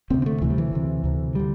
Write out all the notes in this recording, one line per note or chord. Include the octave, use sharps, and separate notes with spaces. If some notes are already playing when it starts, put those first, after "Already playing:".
D2 C3 C4
C4
A3
D2 C3 E3
G3
E3
D2 C3
D2 C3
D3 G3